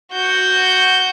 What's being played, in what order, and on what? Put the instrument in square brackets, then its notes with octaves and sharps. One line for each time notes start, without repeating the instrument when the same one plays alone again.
[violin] F#4 G6